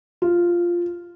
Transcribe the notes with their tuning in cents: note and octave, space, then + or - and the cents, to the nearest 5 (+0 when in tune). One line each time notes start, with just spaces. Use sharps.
F4 -5